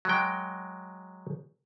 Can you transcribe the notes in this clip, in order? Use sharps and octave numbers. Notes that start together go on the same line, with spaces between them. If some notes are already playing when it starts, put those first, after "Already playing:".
F#3 G#3 G5